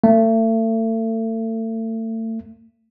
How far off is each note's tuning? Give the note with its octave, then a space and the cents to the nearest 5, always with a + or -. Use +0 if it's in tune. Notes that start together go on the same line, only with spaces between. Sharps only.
A3 +35